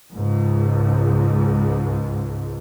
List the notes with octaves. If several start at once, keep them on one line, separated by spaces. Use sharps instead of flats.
C#2 G#2